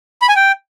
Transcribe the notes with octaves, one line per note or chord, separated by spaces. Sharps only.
B5
G#5
G5